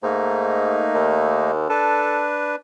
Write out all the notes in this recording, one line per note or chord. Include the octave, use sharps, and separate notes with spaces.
G#2 A3 A#3 D#4
D#2
D4 A4 B4